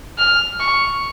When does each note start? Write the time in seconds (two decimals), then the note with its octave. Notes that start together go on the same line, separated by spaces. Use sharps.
0.18 F6
0.60 C#6